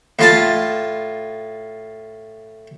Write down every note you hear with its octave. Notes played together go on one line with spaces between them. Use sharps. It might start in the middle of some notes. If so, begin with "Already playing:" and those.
A2 F4 A5